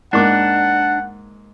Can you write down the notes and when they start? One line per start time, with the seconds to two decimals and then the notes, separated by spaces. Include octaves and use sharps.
0.13 G#2 A#3 D4 F#5 D6